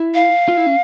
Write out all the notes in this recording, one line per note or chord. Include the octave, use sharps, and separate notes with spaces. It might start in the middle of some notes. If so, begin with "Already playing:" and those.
Already playing: E4
F5
F4
E4
C#4